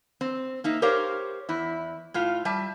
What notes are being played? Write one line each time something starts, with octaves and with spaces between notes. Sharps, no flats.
C4
A#3 D#4 E5
G4 A#4 C5 C#5 F5
E2 E4
A2 F4 F5
G3 E5 A5